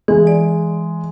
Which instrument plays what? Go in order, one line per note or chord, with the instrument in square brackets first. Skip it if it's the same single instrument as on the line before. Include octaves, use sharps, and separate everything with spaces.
[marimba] E3 [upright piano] G#3
[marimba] D5